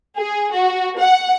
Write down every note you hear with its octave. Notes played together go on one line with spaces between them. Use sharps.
G#4
F#4
F#5